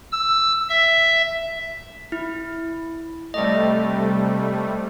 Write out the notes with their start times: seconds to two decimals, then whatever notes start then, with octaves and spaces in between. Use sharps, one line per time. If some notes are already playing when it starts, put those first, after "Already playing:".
0.12 E6
0.69 E5
2.12 E4
3.34 C3 G3 A3 D5 D#5